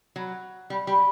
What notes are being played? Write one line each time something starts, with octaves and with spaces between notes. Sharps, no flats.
F#3
G3
G3